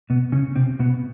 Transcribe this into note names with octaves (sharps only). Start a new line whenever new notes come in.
B2 B3
C#3 C#4
C3 C4
B2 B3